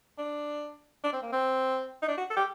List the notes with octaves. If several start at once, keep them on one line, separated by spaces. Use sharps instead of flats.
D4
D4
C4
A#3
C4
D#4
D4
F#4
A4
G4